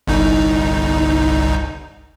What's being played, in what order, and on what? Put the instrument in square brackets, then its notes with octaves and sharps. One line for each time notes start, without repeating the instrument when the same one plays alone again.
[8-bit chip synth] G1 C2 D#4